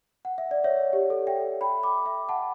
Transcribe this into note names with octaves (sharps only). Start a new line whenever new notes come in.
F#5
E5
D5
C#5 E5
G4
A4
E5 G5
G5 B5
B5 D6
E5 G5
F#5 A5